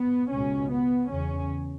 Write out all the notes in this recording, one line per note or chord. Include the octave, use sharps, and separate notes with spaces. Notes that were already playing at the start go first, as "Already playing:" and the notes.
Already playing: B3
C#2 B2 C#4
B3
E2 C#3 C#4